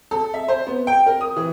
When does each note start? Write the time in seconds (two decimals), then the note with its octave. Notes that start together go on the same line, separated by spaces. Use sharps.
0.11 A4
0.34 E5
0.48 C5
0.67 B3
0.87 G5
1.06 A#4
1.21 D#6
1.36 E3